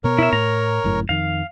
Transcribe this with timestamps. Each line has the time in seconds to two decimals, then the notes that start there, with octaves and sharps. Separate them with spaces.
0.04 B2 B3 A#4 C#5
0.19 E4 E5
0.33 A2 A#5
0.84 G1 F#2 A2
1.09 F2 D#3 F5